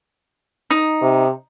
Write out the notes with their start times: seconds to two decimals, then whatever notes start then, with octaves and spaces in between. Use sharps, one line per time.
0.71 D#4
1.02 C3